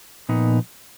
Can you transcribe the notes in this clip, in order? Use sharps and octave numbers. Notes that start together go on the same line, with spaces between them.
A#2 F3 B3 D#4